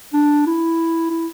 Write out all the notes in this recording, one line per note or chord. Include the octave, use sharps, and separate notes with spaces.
D4
E4
E4